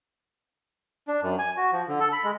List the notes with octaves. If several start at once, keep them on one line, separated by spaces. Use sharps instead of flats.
D4
F#2
G#5
F#4
F3
D3
A4
B5
G#3